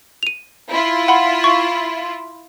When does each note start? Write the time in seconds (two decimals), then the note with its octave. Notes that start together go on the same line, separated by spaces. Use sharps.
0.23 D#7 F7
0.70 E4 F4
1.08 F#5 B5
1.44 C#6